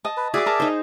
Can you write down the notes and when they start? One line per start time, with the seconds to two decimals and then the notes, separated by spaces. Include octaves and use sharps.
0.05 D#5 A5
0.17 B4
0.34 F#4 G#4 D5 E5 D6
0.46 A#4 A5 D6
0.60 D#4 C5